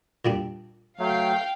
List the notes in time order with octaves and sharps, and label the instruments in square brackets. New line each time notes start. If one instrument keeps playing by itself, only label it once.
[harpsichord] A#2 G3 D4
[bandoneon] F#3 A3 [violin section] F5 G5